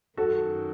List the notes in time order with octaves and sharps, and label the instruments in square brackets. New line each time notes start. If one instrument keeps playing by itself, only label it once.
[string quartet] F#2 D#3 F#3 [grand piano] F#4 A4